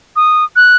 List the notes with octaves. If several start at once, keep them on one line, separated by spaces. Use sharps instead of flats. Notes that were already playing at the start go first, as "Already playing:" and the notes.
D#6
F#6